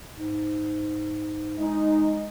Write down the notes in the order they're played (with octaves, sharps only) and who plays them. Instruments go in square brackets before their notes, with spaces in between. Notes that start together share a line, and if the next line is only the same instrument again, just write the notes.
[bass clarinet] G#2
[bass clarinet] G#3 [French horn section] D#4